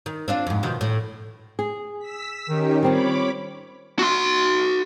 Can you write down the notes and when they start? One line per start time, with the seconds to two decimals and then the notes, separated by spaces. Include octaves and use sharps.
0.06 D#3
0.28 C4 D4 F4
0.47 F2 G#2
0.63 B2 D#3 F3
0.81 A2
1.59 G#4
1.99 E6 B6
2.49 D#3 C#4 D#4 G4
2.83 G3 C4 F4 C#5 B5 D6
3.99 F#4 C6